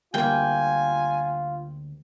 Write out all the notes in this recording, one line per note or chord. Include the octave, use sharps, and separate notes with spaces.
D2 G3 A#3 F4 G5 G#5